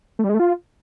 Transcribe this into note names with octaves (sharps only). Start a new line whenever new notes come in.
A3
G3
G#3
A3
F4